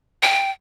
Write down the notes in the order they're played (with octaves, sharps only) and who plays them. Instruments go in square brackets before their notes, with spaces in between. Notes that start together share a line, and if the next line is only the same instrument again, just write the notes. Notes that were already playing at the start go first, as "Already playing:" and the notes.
[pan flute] G5